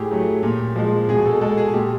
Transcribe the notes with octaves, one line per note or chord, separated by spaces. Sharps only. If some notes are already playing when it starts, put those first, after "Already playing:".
Already playing: A2 G4 G#4
F#3 A3
A#2
F3 G#3
B2 G#4
A4
G#3 A4
G#4
A#2 G4